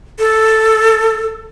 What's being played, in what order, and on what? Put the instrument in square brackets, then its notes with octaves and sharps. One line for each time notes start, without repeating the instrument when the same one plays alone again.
[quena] A4